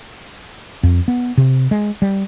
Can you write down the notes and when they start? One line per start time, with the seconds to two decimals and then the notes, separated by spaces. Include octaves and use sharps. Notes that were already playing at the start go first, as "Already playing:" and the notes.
0.83 F2
1.08 B3
1.37 C3
1.71 G#3
2.02 G3